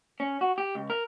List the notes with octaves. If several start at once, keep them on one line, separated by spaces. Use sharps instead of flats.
C#4
F#4
G4
C#2
A#4